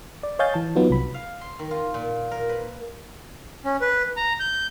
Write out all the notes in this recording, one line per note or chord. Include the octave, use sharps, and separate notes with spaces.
D5
C#5 D#5 F5 G#5 G6 A6
E3 A5
F#3 B3 D#4 F4
C2 B5
F5
C6
D#3
F4
A#2
A#4
B4
C#4
B4
A#5
G6